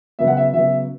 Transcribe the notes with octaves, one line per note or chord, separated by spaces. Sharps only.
C#3 F#3 B3 E5
F#5
E5
C#3 F#3 B3 E5